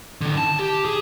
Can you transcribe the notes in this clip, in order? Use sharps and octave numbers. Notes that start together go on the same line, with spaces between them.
D3 D#3
A5
G4
G#4